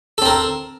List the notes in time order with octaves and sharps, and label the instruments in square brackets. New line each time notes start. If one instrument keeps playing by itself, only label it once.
[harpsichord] A4
C4
A#4